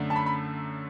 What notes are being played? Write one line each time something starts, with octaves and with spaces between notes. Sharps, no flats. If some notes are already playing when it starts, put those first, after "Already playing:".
Already playing: F#2 D3 A3
A5
B5
B5